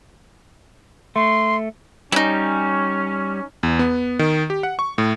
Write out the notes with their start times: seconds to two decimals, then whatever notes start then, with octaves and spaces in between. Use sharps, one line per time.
1.16 A3 C6
2.12 G3 C#4 D#4 E4
3.63 E2
3.79 B3
4.19 D#3
4.50 G4
4.63 F#5
4.79 C#6
4.98 A2